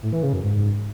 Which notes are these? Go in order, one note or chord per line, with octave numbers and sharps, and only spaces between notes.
A2
E3
C#3
F#2
G#2